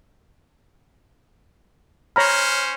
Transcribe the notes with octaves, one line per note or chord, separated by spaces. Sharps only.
C#4 C5 C#5 A#5 B5 F6